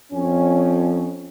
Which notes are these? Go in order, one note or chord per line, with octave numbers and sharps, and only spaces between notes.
F2 C#4